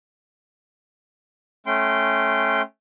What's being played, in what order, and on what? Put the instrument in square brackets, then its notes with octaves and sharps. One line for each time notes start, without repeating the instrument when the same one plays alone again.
[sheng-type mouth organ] A3 C#4 G5 C6